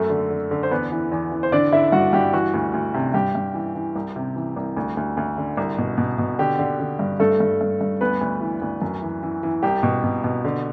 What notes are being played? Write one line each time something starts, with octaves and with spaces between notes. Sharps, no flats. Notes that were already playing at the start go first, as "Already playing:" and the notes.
Already playing: F#2 A3 A4
D3
D3
D3
C5
E2 B3 B4
E3
E2
E3
C5
D3 D4 D5
D3 E4 E5
G2 F#4 F#5
G2 G4
E3 F#4
D2
D2
C3
G2 G4
G2
E3
E3
C2
C3
E3
C2
D2
D2
D2
D3
C2
B2
B2
B2
D3 G4
D3
D3
G2
G2 A3 A4
G2
G2
G2
D2 B3 B4
D2
E3
D2
F#2
E3
E3
E3
C2 G4
B2
B2
B2
D3